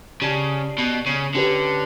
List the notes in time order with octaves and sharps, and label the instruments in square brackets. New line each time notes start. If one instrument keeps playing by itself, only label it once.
[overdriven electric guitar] C#3 [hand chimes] G4 D5 A5
[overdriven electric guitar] B2
C#3
[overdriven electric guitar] D3 [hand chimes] C#4 G4 B4